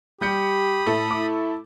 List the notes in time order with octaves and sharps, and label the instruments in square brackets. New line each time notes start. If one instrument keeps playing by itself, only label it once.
[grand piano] G3 G6 C#7 [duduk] G4 [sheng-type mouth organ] B5 D#6
[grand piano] A2 [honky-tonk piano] A3 A4
[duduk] E4 [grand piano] D6